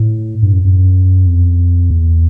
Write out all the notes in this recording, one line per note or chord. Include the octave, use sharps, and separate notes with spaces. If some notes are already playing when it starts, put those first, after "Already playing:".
Already playing: A2
G2
F#2
F#2
F2
E2